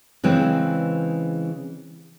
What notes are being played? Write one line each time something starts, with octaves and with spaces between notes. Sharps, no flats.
C#3 E3 G#3 C4